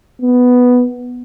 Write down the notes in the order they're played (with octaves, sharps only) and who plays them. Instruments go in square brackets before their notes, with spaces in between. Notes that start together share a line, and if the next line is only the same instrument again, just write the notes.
[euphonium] B3